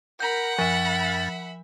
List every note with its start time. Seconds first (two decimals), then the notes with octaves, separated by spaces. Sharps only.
0.20 A#4 F#5 B5 G6
0.58 F#2 F3 E5 B5 A6